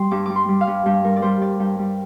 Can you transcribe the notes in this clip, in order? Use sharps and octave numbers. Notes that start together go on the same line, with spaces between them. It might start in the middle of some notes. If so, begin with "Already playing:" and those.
Already playing: G3 C6
G2 D6
G3 D6
C6
G3
F5
G2
G2 G4
G3 A#4
D5
G3 C5
G2 D5
G2 G5
G3